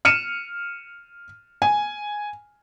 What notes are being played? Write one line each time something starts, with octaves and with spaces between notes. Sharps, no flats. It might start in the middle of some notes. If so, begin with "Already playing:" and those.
F6 C#7 D#7 E7
G#5